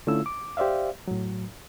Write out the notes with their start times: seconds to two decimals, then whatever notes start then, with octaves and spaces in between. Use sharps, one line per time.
0.07 D3 A3 C#4 E4 F4 E6
0.26 D6
0.57 G4 C5 D5 E5 F5
1.08 A2 F#3